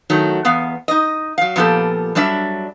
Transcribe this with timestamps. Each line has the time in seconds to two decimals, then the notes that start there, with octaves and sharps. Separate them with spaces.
0.10 D#3 F#3 A3
0.45 E2 B3 F5
0.88 D#4 D#5
1.38 F#3 F5
1.56 A#2 F3 B3 D#4 G4 A4
2.15 F#3 G3 D4 D5 E5